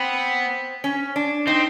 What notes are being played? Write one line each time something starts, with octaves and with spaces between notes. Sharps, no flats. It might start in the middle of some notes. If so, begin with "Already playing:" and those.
Already playing: B3 C4
C#4
D4
C4 D#4